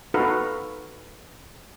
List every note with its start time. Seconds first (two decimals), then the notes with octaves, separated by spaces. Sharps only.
0.14 D#4 F#4 A4 B4 F5 A#5